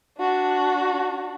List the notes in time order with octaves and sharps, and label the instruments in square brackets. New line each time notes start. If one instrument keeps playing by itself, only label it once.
[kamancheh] D4 F#4